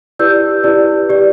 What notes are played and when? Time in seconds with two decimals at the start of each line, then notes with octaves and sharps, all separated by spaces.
0.19 E4 G4 B4 D5 E6 G6
0.64 E4 G4 B4 D5
1.09 G4 D5